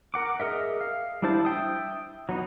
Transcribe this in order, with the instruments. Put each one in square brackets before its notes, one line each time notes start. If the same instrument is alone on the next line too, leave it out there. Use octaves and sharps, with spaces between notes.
[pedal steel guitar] A#4 F#5 D6
G#4 A#4 D#5 E5
F5
G3 D4 E4 C5 A5
E5 G5 D#6
F#3 B3 D#4